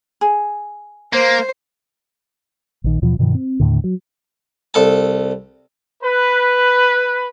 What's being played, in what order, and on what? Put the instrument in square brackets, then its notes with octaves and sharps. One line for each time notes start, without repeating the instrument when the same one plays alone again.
[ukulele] G#4
[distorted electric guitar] A#3 [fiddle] C5
[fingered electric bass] A#1 D#3
D#2 B2 E3 F3
G2 B2 D#3 F3
C4
D#2 A2 D3
F#3
[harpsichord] C2 A4 A5
[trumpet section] B4